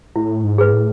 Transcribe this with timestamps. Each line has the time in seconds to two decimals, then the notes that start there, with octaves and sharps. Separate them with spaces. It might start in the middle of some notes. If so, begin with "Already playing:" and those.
0.16 A2 E4
0.44 G#2
0.58 G#4 B4
0.73 A2